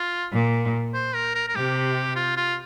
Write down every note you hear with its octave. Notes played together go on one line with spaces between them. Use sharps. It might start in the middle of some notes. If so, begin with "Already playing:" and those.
Already playing: F4
A#2
C5
A#4
A#4
A#4
C3 G4
F4
F4